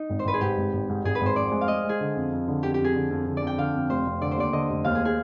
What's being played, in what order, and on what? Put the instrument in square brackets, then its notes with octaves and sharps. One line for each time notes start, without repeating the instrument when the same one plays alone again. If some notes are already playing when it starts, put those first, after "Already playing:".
Already playing: [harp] D#4
[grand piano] G#1
[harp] C5
[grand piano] G#1 [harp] B4
[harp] G#4
[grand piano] G#2 [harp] G4
[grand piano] G#1
G#1
G#2
[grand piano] G#1 [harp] G#4
[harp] B4
[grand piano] G#1
[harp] C5
[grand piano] F2 [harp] D5
[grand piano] G#3
[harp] F5
[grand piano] G#3 [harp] D#5
[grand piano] G#3 [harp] G#4
[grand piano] D3
F2
F2
D3
[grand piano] F2 [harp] G4
[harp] G4
[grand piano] F2 [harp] G#4
[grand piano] D3
F2
D3
[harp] D5
[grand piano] F2 [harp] G5
[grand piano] D3 [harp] F5
[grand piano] F2
[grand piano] F1 [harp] C5
[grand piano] F1
[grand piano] D3 [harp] D5
[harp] C5
[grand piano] D#2 [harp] D5
[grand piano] D3 [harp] D#5
[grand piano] F1
[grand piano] D#2 [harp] F5
[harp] G#4
G#4